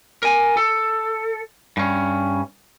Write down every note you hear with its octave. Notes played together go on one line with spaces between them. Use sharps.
A#4 G#5
A4
G2 C#4